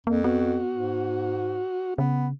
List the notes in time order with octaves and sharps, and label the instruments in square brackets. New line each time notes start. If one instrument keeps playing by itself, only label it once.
[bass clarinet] F2 [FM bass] A#3
[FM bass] B3 [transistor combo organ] F#4
[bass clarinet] G#2
[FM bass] C#3 [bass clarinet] B3